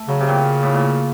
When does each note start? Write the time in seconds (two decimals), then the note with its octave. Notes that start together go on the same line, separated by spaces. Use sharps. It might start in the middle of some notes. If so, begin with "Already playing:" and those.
Already playing: A3
0.08 C#3 F#3
0.21 C3
0.29 A#2
0.63 A2
0.74 A#2